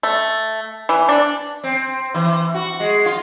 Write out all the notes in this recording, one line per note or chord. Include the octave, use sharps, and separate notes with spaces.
A3
E3
D4
C4
E3
F#4
G#3
F4